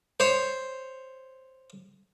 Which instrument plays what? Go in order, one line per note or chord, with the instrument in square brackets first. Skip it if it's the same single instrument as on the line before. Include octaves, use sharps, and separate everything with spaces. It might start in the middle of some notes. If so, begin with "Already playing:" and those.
[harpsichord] C5 C#5